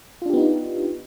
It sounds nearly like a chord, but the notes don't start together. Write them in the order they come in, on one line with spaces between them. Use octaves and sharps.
F4 D4 G4 B3 D#4